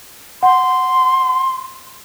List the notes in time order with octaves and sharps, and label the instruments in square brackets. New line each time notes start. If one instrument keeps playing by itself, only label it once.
[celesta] F#5 [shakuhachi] C6